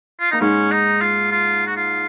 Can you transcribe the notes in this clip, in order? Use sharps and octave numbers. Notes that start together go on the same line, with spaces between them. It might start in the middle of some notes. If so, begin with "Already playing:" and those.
F4
A#3 D#4
G#2 G#3 C#4
D#4
F4
F4
F#4
F4